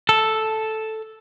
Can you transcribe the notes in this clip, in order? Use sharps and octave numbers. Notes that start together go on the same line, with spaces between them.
A4